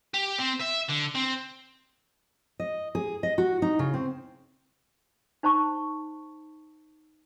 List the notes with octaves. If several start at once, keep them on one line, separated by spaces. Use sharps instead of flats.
G4
C4
E5
D3
C4
D#5
G#4
D#5
F#4
D#4
C#3
C4
D#4 C5 A5 C#6